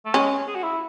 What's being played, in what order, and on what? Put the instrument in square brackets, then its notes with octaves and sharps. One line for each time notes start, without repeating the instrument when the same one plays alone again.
[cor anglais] A3
[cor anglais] G#3 [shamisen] C#4
[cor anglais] G#4
F#4
E4